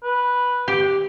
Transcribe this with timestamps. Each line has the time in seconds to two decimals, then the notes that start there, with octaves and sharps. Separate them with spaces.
0.03 B4
0.68 G4